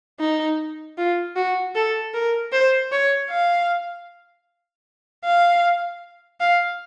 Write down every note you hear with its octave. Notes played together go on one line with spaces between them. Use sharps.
D#4
F4
F#4
A4
A#4
C5
C#5
F5
F5
F5